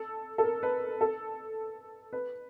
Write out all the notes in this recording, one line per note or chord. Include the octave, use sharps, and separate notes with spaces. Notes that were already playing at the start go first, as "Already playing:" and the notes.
Already playing: A4
A4
A#4
B4
A4
B4